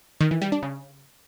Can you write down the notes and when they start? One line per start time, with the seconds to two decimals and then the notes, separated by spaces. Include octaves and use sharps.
0.21 D#3
0.31 E3
0.42 G3
0.52 D4
0.63 C#3